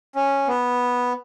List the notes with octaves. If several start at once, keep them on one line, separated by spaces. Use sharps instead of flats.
C#4
B3